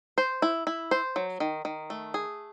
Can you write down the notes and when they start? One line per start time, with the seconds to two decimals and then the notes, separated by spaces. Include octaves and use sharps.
0.18 C5
0.42 E4
0.67 E4
0.91 C5
1.16 F#3
1.40 D#3
1.65 D#3
1.90 A3
2.14 G#4